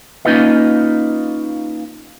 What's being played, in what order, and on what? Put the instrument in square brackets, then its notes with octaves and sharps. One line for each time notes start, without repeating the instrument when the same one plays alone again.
[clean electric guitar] A#3 C#4 D#4 F4 B4 D#5